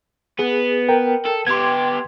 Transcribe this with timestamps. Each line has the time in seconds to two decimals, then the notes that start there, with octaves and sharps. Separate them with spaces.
0.39 B3 G#4
0.89 A#4 G5
1.25 A4
1.47 B3 G4 C6 G#6